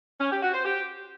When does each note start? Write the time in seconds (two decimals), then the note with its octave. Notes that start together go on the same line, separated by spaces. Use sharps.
0.21 C#4
0.32 G4
0.43 F#4
0.54 C5
0.65 G4